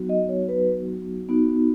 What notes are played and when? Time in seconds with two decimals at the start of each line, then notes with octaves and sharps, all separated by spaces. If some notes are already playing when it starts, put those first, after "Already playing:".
Already playing: F#3 B3 D#4 F#4
0.09 D#5
0.29 C#5
0.49 B4
1.29 B3 D#4 F#4